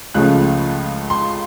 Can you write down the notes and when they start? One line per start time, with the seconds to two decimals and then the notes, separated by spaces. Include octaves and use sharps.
0.14 C#2 C#3 F3 A3 C#4 F#6
1.10 C6